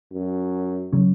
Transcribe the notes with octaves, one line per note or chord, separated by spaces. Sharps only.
F#2
C#3 F#3 C#4